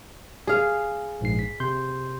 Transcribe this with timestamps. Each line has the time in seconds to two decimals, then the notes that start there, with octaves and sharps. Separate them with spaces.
0.47 G#4 F5
1.21 A#1 G#2 C7
1.39 B6
1.60 C3 C6 G6